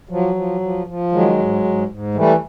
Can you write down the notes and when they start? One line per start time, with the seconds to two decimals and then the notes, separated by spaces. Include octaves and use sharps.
0.09 F3 F#3
0.35 F3
0.61 F3
0.87 F3
1.12 D#3 F#3 G#3
1.38 G#2
1.64 G#2
1.89 G#2
2.15 E3 G3 A3